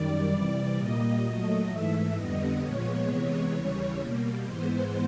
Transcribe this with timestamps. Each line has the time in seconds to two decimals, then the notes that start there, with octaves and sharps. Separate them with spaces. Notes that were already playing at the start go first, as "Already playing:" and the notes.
Already playing: F#2 D#3 G3 D5
0.31 C3 E3 G3 D5
0.76 A#2 G3 A#3 D#5
1.23 A#2 F#3 A3
1.68 G#2 E3 A3 E5
2.15 F2 D3 G3 B3 D#5
2.60 A#2 F3 G#3 B3 C#5
3.06 C3 E3 G#3 B3 C#5
3.52 D#2 C#3 E3 G3
3.98 B2 G3 A#3
4.44 G#2 E3 G#3 B3 C5